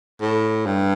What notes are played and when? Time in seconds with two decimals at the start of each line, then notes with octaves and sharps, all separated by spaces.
0.21 A2
0.66 G2